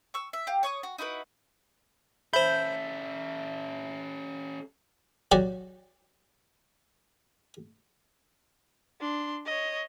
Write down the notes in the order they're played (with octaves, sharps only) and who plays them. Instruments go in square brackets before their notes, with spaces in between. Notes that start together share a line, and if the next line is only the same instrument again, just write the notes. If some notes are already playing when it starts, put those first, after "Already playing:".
[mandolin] C#6 E6
E5
G4 F5
C#5 C#6 D#6
F#4
D#4 E4 F#4 B4
[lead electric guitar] C#4 A4 [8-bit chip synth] C5 B5 [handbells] E5 [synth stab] G6
[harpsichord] F#3 F#4 G4 D5
[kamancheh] D4 C6
C#5 D#5